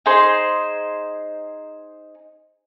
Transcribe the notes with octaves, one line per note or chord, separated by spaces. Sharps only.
D#4 G#4 C5 C6